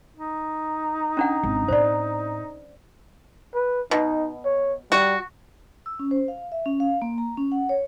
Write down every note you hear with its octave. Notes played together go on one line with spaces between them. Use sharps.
D#4
C#4 D4 F#5
G#1
A2 C4 C5 D5
B4
B2 D#4
C#5
G3 F#4
E6
C#4
C5
F5
E5
C#4
F5
A#3
A#5
C#4
F#5
C#5